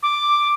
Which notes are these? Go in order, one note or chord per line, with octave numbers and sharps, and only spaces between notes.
D6